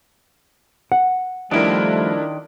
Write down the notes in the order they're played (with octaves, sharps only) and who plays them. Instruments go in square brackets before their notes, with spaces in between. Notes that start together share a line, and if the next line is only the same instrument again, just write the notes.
[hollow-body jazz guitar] F#5
[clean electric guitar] D#3 D5 [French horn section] F3 G3 A3 [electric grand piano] D4 E4 A#4